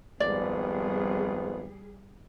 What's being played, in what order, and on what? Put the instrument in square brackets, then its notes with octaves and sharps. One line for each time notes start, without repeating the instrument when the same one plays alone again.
[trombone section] G#1 F2 B3 [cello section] G3 G#4 [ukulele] D5